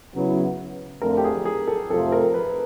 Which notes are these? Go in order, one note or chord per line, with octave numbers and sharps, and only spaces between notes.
C#3 F#3 B3 E4
F2 D3 F3 A3 A#4
G4
G#4
G#4
A4
F2 C3 F3 A3 A4
A#4
B4